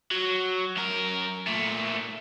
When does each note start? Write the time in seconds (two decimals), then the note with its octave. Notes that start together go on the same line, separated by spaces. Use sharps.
0.11 F#3
0.77 F#2 A#4
1.47 A#2 A3